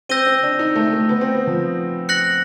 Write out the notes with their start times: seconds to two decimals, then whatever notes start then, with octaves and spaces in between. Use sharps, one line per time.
0.09 C4 E6 G6 A#6 D#7 G7
0.26 C4
0.43 D4
0.59 D#4
0.76 A3
0.93 A3
1.09 B3
1.21 C4
1.34 B3
1.47 F3
2.09 F#6 A#6 C#7 F#7